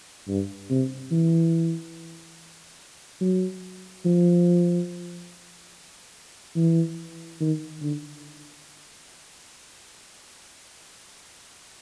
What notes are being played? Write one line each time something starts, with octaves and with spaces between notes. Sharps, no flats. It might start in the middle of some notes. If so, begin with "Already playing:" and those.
G2
C3
E3
F#3
F3
E3
D#3
D3